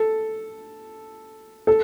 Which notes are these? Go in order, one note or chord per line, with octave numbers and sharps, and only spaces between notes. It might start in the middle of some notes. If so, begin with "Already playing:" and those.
Already playing: A4
A4